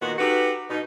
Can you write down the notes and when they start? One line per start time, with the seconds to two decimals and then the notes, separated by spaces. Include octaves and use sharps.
0.01 A#2 D#3 B3 F#4
0.18 D#4 F#4 G4 A4 B4
0.70 B2 D#4